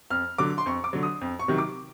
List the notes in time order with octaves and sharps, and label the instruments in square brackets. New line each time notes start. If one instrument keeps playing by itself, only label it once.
[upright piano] F2 F6
D3 F#3 D6
C6
F2 C#6
D6
D3 F#3
D#6
F2
C#6
C3 D#3 F#3
D6